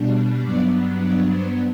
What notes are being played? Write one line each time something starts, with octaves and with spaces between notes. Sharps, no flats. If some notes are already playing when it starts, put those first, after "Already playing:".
Already playing: B2 G3 D4
G2 F#3 B3 D4 D5
D5
C5